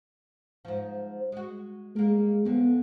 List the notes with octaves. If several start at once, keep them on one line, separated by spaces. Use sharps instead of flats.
G#2 F3
G#3 F#4
G#3 A#3 A#4
F2 D3 B3